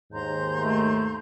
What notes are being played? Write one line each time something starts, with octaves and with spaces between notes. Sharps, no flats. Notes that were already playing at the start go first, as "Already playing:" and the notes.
D#2 G#2 A#5 C6 G6
A3